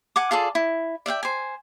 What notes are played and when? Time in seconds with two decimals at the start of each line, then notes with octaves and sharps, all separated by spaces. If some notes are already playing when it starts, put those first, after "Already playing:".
0.16 F#5 G#5 D6
0.31 F4 G#4 A4 D5
0.55 E4
1.06 D5 E5 F#5 G5
1.23 C5 G#5